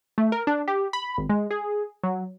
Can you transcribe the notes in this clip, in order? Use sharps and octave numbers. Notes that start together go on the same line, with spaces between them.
A3
A#4
D4
G4
B5
G#1
G#3
G#4
F#3